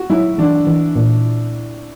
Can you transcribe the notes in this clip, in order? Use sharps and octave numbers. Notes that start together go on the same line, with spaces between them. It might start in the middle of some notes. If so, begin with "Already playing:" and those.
Already playing: F#4
F#3 E4
E3 D4
E3
A#2